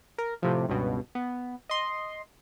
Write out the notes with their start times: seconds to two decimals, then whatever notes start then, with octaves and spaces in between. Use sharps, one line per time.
0.18 A#4
0.42 A2 C3 F3
0.68 C#2 G2 B2
1.15 B3
1.69 D#5 C6